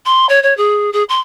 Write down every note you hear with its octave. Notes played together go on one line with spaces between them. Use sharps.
C6
C#5
C#5
G#4
G#4
C6